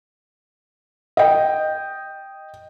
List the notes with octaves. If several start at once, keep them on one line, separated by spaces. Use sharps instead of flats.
D#5 G5